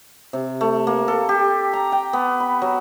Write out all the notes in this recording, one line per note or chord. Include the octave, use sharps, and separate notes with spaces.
C3
A3
A#3
A4
G4
A#5
G5
B3
B5
F#3